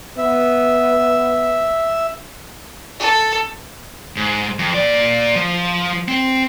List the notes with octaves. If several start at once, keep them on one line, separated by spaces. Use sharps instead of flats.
B3 E5
A4
G#2
F2
A#2 D5
F3
C4